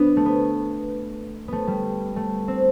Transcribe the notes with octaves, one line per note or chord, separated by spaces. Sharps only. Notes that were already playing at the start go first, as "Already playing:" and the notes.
Already playing: B3 D4
A3
B3
A3 B3
G3
A3
C4